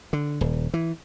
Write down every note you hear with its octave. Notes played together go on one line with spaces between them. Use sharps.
D3
D#1
E3